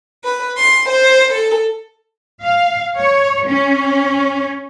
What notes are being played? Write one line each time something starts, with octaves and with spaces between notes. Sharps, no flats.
B4
C6
C5
A4
F5
C#5
C#4